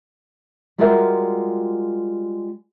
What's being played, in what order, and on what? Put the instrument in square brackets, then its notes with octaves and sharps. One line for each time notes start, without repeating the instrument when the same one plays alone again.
[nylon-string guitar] G3 G#3 F4 F#4 A#4 E5